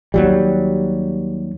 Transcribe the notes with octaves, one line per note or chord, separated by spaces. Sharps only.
D#2 F#3 G3